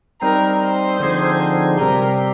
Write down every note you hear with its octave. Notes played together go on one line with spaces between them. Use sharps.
G3 C4 D#4 A#4
C5
D3 F3 C4 D#4 G#4
C3 G3 C4 G4 A#4